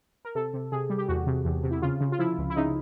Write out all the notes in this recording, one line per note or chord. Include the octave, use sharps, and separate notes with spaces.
A#4
C3 A4
C3
C3 G#4
G3
G4
E2 F#4
C3
E2
C3
E4
C#3 F4
C#3
F4
F3 E4
C#2
E4
C#3 D#4